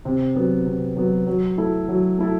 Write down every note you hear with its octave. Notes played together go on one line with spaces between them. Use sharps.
C3
F#3 B3
C3
F#3 B3
F#3
A3 E4 A4
F#3
A3 E4 A4